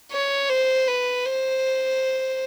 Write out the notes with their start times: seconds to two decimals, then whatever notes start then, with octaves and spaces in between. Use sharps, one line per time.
0.12 C#5
0.49 C5
0.88 B4
1.26 C5